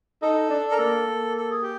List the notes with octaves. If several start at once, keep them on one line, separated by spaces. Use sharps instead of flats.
D#4 A4
D4
A#4
A#3 A4
A#3
A4
G#4
G4